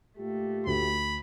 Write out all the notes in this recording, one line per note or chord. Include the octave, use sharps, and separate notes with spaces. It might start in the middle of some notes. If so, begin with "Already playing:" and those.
A#2 A3 F4 G4
D2 B5